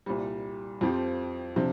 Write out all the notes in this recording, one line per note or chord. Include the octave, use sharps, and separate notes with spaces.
C2 A#2 G3
F2 F3 C4 G4
C3 F3 D4